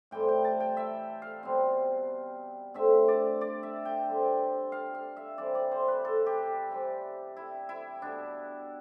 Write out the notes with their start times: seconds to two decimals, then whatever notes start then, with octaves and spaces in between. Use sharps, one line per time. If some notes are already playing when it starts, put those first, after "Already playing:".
0.11 A2 E3 G3 C4 G5
0.28 G5
0.44 A5
0.60 G5
0.77 E5
1.22 F5
1.43 B2 G3 C4
2.74 D3 A3 C4 E5
3.08 D5
3.41 D5
3.63 E5
3.85 G5
4.06 D3 G3 C4
4.72 F5
4.95 F5
5.17 E5
5.38 C3 E3 G3 D5
5.55 D5
5.71 C5
5.88 B4
6.05 A4
6.26 G4
6.70 C3 E3 G3
7.37 E4
7.69 E4
8.02 B2 B3 D4